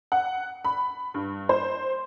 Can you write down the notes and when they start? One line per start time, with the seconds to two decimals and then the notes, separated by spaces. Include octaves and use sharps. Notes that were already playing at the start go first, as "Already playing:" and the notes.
0.12 F#5
0.65 B5
1.14 G2
1.49 C5